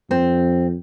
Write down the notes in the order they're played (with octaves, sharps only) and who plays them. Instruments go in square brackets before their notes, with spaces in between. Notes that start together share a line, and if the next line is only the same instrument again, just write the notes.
[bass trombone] F2 [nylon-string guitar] C4